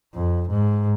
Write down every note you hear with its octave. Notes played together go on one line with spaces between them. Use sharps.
F2
G#2